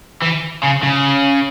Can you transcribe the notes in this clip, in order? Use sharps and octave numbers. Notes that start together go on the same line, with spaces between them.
E3
C#3
C#3